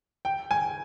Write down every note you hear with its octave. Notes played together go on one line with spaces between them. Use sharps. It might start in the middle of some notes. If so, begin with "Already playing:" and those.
G5
G#5